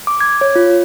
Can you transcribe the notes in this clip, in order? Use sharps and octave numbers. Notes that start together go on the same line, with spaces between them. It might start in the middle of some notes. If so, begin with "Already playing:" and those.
D6
G#6
C#5
F4